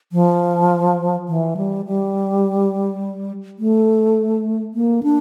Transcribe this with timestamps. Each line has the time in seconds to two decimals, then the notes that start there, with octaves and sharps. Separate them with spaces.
0.12 F3
1.28 E3
1.57 G3
1.86 G3
3.59 A3
4.74 A#3
5.03 D4